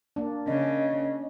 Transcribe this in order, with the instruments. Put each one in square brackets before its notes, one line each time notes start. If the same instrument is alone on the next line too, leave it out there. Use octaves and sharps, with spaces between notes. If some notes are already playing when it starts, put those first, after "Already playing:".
[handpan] A#3 D4
[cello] C#3 [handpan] C#4 [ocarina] D#5